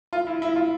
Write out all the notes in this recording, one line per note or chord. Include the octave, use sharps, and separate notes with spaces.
F4
E4
E4
F4